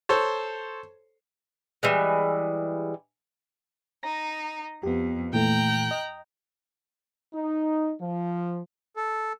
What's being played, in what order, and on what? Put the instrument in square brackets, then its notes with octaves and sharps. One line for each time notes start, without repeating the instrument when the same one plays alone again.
[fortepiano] A4 C5 C#5
[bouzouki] E3 G3 G#3
[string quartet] D#4 [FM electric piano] A#5 A#6
[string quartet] F2 [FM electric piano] B3 G4
[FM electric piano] A#2 E3 A3 [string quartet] G5 A#5 F#6
[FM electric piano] D#5
[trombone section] D#4
F3
[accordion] A4